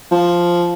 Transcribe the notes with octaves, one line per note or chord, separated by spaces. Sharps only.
F3